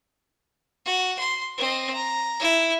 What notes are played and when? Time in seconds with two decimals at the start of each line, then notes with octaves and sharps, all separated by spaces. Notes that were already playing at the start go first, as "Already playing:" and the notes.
0.85 F#4
1.19 C6
1.57 C4 D#5
1.94 A#5
2.40 E4